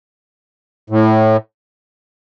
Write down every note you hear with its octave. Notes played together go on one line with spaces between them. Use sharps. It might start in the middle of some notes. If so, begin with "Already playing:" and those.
A2